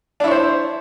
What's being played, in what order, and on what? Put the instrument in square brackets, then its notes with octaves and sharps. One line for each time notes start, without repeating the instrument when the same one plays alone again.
[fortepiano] D4
E4
C#5
C5